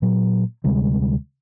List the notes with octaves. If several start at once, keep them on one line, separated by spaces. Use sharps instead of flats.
A#2 F#3
D2 C3 G3 G#3